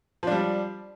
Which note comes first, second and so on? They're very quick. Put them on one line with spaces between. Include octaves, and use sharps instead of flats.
F3 D4 G3